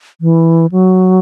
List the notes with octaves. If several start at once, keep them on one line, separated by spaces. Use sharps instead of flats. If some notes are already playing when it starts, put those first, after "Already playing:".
E3
F#3